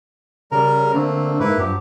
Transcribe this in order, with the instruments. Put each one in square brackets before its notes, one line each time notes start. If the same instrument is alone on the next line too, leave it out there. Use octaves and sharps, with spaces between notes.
[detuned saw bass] C#3 [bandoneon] G3 A#4 A#5
[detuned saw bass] D3 [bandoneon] A3 A#3 C4
[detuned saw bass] G#2 [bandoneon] A#3 E4 B4
[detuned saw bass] G2 [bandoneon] F3 F#3 G4